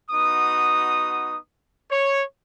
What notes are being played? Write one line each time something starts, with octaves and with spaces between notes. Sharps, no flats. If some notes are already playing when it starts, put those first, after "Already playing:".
B3 D#4 F#4 D#6
C#5